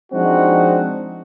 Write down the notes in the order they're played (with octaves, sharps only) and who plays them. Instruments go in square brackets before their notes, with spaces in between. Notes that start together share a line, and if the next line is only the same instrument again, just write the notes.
[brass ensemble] F3 G#3 C4 D4 D#4 F#4